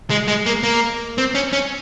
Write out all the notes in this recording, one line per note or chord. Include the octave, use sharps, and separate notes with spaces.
G#3
G#3
A#3
A#3
C4
C#4
C#4